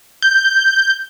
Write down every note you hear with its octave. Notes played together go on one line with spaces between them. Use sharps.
G6